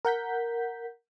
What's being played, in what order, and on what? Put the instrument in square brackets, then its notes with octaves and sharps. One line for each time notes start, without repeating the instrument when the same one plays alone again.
[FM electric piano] A#4 F#5 G6 B6